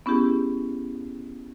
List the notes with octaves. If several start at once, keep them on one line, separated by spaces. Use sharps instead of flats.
B3 C#4 E4 G4 G#4